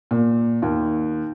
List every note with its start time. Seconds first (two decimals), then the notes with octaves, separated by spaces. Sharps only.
0.11 A#2
0.62 D#2